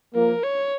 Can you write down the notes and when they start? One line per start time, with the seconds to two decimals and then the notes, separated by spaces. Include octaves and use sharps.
0.15 F3 A#3 A#4
0.44 C#5